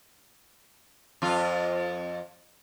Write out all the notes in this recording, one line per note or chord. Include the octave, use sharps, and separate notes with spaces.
F2 F4